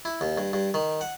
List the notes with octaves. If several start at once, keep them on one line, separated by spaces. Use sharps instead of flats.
E4
D#2
G2
G2
D#3
F#5